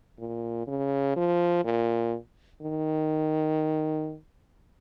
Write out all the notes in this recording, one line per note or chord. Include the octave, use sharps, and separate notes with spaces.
A#2
C#3
F3
A#2
D#3